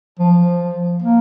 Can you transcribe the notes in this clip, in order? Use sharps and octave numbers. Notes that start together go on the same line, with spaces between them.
F3
A#3